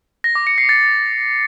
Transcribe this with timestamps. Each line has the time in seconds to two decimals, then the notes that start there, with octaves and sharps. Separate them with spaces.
0.24 A#6
0.35 D6
0.47 C#7
0.58 C7
0.69 A6